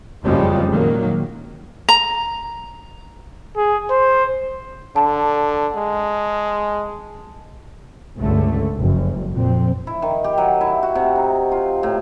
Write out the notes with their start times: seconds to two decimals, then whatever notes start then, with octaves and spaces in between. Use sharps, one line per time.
0.24 F#1 F2 C#3 F3 G3 G#3
0.70 A#2 D#3 F#3 A#3
1.89 A#5
3.57 G#4
3.90 C5
4.96 D3 A5
5.76 G#3
8.18 C#2 G2 D3 A3
8.78 F#1 F2
9.33 F2 A#2 C4
9.87 E4
10.02 D#3
10.24 G4
10.38 F#3
10.61 E4
10.83 F#4
10.95 C3
11.16 D#4
11.52 F4
11.83 A2